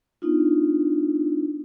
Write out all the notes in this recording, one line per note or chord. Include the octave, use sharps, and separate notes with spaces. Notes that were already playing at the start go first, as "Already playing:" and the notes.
B3 D4 D#4 F4